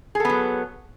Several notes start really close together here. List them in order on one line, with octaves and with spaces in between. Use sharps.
G#4 A4 B3 F#3